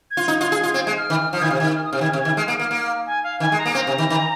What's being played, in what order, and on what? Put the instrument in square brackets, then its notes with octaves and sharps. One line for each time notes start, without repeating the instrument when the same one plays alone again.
[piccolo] G#6
[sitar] F4
D#4
F4
G#4
F4
C4
G#3
[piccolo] F6
[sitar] D#3
[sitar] F3 [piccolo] F6
[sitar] D#3 [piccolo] G#6
[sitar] C3 [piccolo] F6
[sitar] D#3 [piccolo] G#6
[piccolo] F6
D#6
[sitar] C3 [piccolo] F6
[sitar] D#3 [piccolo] G#6
[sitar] C3 [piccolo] F6
[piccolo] G#6
[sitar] D#3
[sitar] G#3 [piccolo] F6
[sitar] A#3
[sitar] A#3 [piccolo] F6
[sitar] A#3
[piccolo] G#5
F5
[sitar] D#3 [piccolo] G#5
[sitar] G#3
[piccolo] A#5
[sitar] A#3
[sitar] C4 [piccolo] A#5
[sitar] C3
D#3
D#3